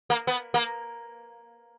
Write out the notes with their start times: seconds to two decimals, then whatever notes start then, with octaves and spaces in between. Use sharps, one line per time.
0.10 A#3
0.27 B3
0.54 A#3